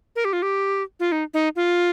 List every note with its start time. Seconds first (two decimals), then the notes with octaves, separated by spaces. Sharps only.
0.16 A#4
0.25 G4
0.33 F4
0.42 G4
1.00 F4
1.12 D#4
1.34 D#4
1.56 F4